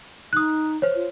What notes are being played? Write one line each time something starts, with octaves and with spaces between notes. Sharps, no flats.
D#4 D#6 F#6
C5 C#5
F4